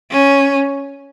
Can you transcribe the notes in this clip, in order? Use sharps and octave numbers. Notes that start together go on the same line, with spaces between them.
C#4